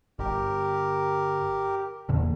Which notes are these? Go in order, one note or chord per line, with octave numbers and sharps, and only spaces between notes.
G1 G4 A#4
E2 A#2 D3